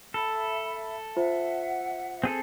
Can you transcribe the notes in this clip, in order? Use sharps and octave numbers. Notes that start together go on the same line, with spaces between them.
A4 E5 B5
F4 C5 E5 F#5
C4 G#4 A4